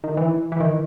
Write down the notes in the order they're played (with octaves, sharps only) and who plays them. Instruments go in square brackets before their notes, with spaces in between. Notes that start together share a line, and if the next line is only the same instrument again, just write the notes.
[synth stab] D#3
E3
E3
D#3